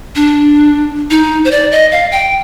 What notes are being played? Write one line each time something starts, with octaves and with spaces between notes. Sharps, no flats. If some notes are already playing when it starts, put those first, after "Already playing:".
D4
D#4
C5
D5
D#5
F5
G5